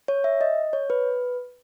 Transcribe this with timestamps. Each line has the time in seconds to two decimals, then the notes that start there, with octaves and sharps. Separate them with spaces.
0.08 C#5
0.24 E5
0.41 D#5
0.73 C#5
0.90 B4